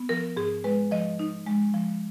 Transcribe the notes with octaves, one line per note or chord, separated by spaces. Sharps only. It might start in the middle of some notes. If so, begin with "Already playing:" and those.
Already playing: B3
F3 A#4
G#2 G#4
G#3 B4
F3 D#5
D#4
G#3
F3